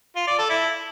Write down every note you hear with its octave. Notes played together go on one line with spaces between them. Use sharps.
F4
D5
A4
E4